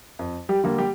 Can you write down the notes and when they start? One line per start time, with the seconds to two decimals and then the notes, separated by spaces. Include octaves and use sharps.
0.19 F2
0.49 G3 G4
0.64 D3 G3 A#3
0.78 G3 G4